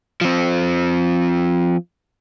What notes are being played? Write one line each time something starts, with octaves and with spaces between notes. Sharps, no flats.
F3 C4